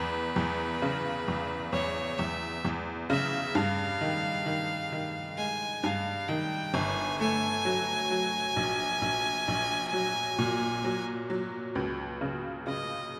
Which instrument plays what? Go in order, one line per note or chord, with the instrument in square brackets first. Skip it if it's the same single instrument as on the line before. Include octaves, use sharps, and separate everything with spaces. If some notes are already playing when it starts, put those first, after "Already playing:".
Already playing: [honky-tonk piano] E2 [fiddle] B4
[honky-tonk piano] E2
C#3
E2
[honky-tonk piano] E2 [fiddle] C#5
[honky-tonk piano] E2 [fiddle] E5
[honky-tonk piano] E2
[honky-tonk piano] C#3 [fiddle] E5
[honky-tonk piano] G2 [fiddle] F5
[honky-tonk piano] D#3
D#3
D#3
[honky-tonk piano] G#3 [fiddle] G#5
[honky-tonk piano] G2 [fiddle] F5
[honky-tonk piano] D#3 [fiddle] G5
[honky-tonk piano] G1 [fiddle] G#5
[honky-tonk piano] A3 [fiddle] G#5
[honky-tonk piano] F#3
F#3
A#1
A#1
A#1
F#3
A#2
F#3
F#3
C#2
C#3
[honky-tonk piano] C#3 [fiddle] D#5